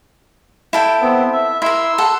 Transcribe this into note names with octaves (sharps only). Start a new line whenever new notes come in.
E4 A4 G5
B3 C4
E5
E4 A#4 C6 E6
A4 F#5